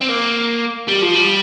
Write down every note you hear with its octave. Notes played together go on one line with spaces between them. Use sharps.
C4
A#3
G3
F3
G3